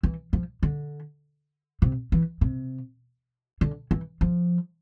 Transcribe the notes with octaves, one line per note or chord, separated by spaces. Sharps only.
E3
F3
D3
C3
E3
C3
D3
E3
F3